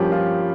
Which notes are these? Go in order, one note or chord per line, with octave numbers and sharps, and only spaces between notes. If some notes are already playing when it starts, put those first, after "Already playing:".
Already playing: G2 F3 A#3 C#4 G4
F4